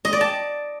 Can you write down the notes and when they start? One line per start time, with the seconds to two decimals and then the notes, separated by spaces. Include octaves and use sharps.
0.05 D#5
0.13 D5
0.21 A5